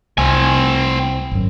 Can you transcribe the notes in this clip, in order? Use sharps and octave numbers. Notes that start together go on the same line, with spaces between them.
C2 C4 G#5
G#1 F#2